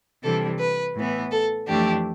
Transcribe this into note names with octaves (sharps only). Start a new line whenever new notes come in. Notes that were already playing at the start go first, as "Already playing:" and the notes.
C3 E3 G3 D4 A4
B4
A2 E3 B3
A4
F2 E3 A3 D4 G4